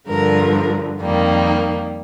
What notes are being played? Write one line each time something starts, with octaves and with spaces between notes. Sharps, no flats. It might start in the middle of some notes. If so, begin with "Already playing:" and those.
G2 D3 F3 A#4
F2 D#3 G3 A#3